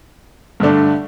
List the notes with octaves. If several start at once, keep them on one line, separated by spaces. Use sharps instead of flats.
G2 D3 A3 D4